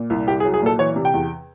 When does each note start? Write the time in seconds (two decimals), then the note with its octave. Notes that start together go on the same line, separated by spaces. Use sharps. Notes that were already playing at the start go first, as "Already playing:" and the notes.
Already playing: A#2
0.10 C2
0.27 C2 G4
0.40 G#4
0.45 F#3
0.54 G#4
0.62 A#2 A4
0.79 E3 C#5
0.96 C3
1.05 G5
1.14 E2